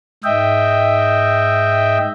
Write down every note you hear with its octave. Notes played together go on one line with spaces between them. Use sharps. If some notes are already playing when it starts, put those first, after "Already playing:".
G#2 D#5 E5 G5